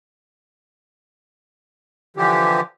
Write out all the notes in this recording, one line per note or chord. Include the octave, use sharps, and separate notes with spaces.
D3 E3 F3 G4